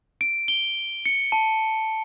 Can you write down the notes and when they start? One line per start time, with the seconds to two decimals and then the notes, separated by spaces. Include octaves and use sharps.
0.21 D7
0.48 G7
1.06 C#7
1.32 A5